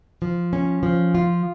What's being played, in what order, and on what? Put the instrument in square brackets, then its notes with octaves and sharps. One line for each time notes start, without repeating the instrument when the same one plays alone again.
[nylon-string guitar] F3
C#4
F3
F4